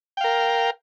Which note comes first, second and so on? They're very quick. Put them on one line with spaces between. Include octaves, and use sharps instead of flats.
G5 F5 A#4